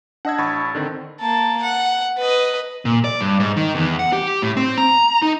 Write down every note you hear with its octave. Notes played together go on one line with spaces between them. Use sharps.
D4 D#5 F#5 E6 G#6
A1 B5 C#6 A6
D3 D#3 C4
A#3 A5
F#5
B4 D#5
A#2
D5
G2
G#2
D#3
E2
F#5
G4
A2
C4
A#5
D#4